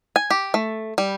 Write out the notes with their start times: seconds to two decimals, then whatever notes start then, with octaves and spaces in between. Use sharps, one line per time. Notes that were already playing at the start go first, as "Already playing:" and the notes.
0.16 G#5
0.30 G4
0.54 A3
0.98 G3